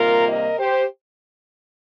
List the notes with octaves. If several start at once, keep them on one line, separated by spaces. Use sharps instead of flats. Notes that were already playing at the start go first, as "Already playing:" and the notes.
Already playing: C3 D#3 G3 A#3 F4 A#4
A#4 D#5
G4 C5